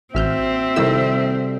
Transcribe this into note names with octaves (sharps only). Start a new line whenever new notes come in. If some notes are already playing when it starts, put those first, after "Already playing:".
A1 C4 F#4 E5 F6 G6
C3 D#3 G3 E4 A4 E6